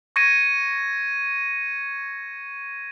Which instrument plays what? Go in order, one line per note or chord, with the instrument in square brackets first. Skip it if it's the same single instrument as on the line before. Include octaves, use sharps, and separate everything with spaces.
[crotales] C#6 G#6 A#6 C#7 D#7